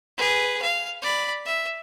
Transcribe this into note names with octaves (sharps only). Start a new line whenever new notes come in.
G#4 B4
F5
D5 B5
E5